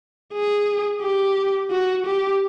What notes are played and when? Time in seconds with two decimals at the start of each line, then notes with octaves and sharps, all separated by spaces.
0.33 G#4
1.02 G4
1.71 F#4
2.06 G4